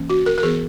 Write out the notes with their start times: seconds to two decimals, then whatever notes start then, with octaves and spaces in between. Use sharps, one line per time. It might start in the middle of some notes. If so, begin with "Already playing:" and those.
Already playing: E3 A#3 C#4
0.10 F#4
0.26 A#4
0.38 A#4
0.43 E3 B3 G#4